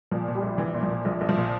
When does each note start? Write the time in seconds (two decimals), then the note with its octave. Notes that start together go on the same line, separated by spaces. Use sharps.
0.11 A#2 F3
0.28 A#2
0.35 G3
0.43 A#1
0.58 A#1 E3
0.74 A#2
0.83 F3
0.90 A#2
1.05 A#1 F3
1.21 A#1
1.29 F3
1.37 A#2